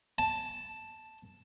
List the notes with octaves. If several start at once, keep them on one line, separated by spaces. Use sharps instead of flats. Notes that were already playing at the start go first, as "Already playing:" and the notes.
A5